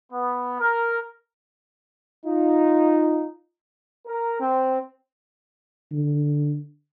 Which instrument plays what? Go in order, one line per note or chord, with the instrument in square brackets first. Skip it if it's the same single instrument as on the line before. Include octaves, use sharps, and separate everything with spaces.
[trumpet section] B3
A#4
[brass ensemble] D#4 F4
[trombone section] A#4
C4
[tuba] D3